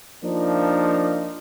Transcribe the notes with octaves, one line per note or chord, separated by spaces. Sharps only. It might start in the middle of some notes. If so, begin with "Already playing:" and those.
F3 A#3 D4 D#4